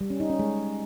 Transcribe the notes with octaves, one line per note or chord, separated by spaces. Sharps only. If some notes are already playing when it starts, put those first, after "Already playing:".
G3
C#4
D#4
C#4
G#3